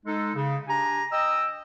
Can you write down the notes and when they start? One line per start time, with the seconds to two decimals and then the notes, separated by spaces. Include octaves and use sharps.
0.06 G#3 D#4 A4
0.35 C#3
0.68 D4 G4 G#5 A#5
1.12 D#5 G5 E6